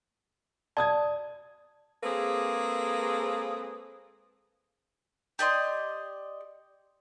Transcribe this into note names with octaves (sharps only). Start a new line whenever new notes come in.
D5 A5 D#6 G#6
G#3 A#3 C4 G#4 A4 B4
G4 D5 D#5 C6